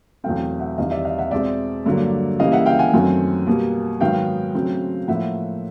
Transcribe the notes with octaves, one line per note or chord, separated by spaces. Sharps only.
E2 B2 F#3 A3 C4 F5 G5
E5 F#5
E2 C3 D#3 G3 D#5 F5
D5 E5
D#5 F5
E5 F#5
B2 G#3 C4 D5 E5
G2 D3 F#3 A#3
C#3 E3 G3 A#3 D#5 F5
E5 F#5
F5 G5
F#5 G#5
F#2 D#3 F#3 A3 C4
B2 G3 A#3
G#2 D#3 F#3 B3 F5 G5
C#3 F#3 A3 C4
A2 F3 A#3 E5 F#5